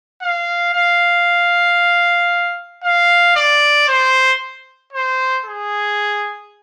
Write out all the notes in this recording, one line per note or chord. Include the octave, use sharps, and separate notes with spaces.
F5
F5
F5
D5
C5
C5
G#4